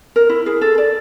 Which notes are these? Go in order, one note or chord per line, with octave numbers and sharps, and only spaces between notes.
A#4
E4
G#4
A4
D5